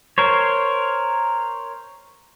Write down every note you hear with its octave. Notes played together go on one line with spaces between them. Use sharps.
A#4 C5 C#5